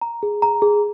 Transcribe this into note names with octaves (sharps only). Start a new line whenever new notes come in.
A#5
G#4
A#5
G#4